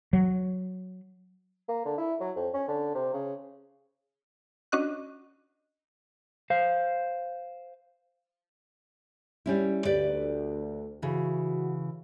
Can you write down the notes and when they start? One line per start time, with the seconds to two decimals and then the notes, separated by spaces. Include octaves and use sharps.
0.13 F#3
1.69 A#3
1.86 D3
1.98 E4
2.20 F#3
2.36 F2
2.54 C#4
2.68 D3
2.95 C3
3.14 C#3
4.72 C#4 D4 F#4 D#5 C#6 F#6
6.50 C5 F5
9.46 G3 C#4 E4
9.85 D2 G4 B4 D5
11.02 C#3 E3 F#4